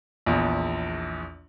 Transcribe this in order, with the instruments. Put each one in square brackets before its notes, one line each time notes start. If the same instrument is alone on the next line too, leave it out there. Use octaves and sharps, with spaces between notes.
[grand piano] A#1 E2